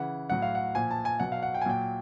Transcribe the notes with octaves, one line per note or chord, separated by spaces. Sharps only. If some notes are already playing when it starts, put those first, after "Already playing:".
Already playing: C#3 E3 F#5
A2 F#3 F#5
F5
F#5
A#2 F3 G#5
A5
G#5
B2 F#3 F#5
F5
F#5
G5
G#5
A#2 F#3 G5